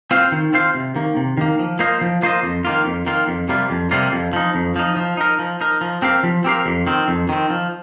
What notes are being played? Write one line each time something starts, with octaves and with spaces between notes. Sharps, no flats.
C4 F4 C5 F5
D#3
C4 F4 C5 F5
C3
D#3 A#3
C3
D#3 A#3
F3
A#3 F4 C5 D#5
F3
A#3 F4 C5 D#5
F2
D#3 A#3 F4
F2
D#3 A#3 F4
F2
C3 G3 A#3 F4
F2
C3 G3 A#3 F4
F2
F3 D#4
F2
F3 D#4
F3
D#4 A#4
F3
D#4 A#4
F3
C4 G4 A#4 F5
F3
C4 G4 A#4 F5
F2
D#3 C4
F2
D#3 C4
F3